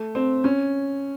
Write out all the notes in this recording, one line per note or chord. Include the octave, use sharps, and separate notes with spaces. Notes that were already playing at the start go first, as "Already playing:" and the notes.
Already playing: A3
C4
C#4